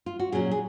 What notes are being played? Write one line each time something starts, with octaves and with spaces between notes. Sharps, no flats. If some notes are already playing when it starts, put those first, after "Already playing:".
F4
F#4
A#2 F#3 C#4 G#4
G#4